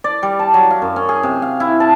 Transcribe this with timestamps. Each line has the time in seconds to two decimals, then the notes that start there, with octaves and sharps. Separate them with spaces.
0.04 D5
0.23 G3
0.39 A5
0.54 F#3
0.70 F5
0.82 F#2
0.96 C#4
1.09 G#4
1.23 C3
1.42 F5
1.60 E4
1.80 A5